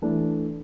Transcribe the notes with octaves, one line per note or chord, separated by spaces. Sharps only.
E3 A3 D4